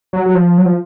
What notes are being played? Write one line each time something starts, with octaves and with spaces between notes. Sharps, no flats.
F#3
F#3
F3
F#3
F3